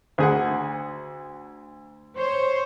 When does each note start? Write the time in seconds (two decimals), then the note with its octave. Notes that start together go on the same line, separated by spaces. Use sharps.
0.18 D2 G#4 F#5
2.17 C5 C#5